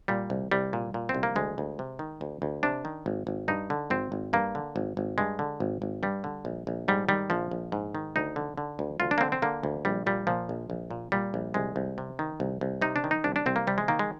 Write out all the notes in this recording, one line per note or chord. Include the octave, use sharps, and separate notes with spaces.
A#2 G3
C2
C2 G3
A#2
A#2
C4
C2
A#3
D2 G#3
D2
C3
D#3
D2
D2
C3 D4
D#3
G#1
G#1
G2 D#4
D3
G#1 C4
G#1
G2 A#3
D3
G#1
G#1
G2 G#3
D3
G#1
G#1
G2 G3
D3
A#1
A#1
G#2 G3
D#3 G3
A#1 F3
A#1
G#2
D#3
D2 D#4
D3
D3
D2
D2 F4
D4
A#3
D3 C4
C4
D3 A#3
D2
A#1 G3
A#2 G3
A#2 F3
A#1
A#1
A#2
A#2 G3
A#1
C2 G#3
C2
C3
D#3
C2
C2
C3 D#4
D4
D#3
D#4
C2 D4
D4
C2 C4
A#3
C3 G3
G#3
D#3 A#3
G#3